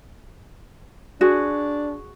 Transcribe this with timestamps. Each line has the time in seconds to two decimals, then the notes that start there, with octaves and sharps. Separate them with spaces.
1.21 D4 F#4 G#4